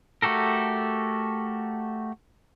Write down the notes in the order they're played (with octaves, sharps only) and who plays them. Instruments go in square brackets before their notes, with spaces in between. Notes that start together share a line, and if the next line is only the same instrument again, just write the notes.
[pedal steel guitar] A3 F#4 G4 A4 A#4